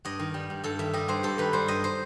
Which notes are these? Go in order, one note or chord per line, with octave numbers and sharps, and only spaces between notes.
G2 D#5
D#3
G3
G2
G2 A4
D#3 E5
G3 D#5
G2 C5
G2 A4
D#3 B4
G3 C5
G2 D#5
C5